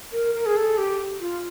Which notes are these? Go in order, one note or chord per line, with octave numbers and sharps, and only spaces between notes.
A#4
A#4
G#4
A4
G4
F4